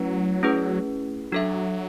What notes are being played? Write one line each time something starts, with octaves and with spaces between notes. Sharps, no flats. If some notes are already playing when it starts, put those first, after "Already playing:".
Already playing: F#3 A3 C#4 E4 B4
A3 C#4 E4 G#4 B4
F#3 D4 A4 E5